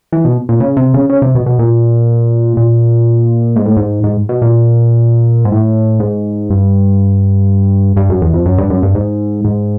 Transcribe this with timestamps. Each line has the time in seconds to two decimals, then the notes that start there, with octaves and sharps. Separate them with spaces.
0.12 E3
0.25 B2
0.49 A#2
0.60 C#3
0.77 C3
0.94 C#3
1.09 C#3
1.22 C3
1.35 B2
1.46 B2
1.59 A#2
2.57 A#2
3.56 G#2
3.66 A2
3.77 G#2
4.04 G#2
4.29 B2
4.42 A#2
5.45 G#2
5.52 A2
6.00 G#2
6.50 G2
7.96 G2
8.10 F#2
8.22 E2
8.34 F2
8.46 F#2
8.58 G2
8.70 F#2
8.83 G2
8.95 G#2
9.45 G#2